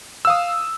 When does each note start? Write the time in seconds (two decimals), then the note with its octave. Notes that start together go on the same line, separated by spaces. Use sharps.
0.25 E6
0.27 F5
0.30 D#6